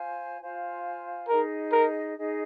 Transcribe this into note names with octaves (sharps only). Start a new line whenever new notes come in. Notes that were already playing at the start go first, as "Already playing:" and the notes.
Already playing: F4 C5 F5 G#5
F4 C5 F5 G#5
D#4 G#4 A#4 D#5
A#4
D#4 G#4 D#5